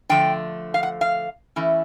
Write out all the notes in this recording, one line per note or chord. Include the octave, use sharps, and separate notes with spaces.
D3 F3 A3 G5
F5
F#5
F5
E3 A3 C#4 E4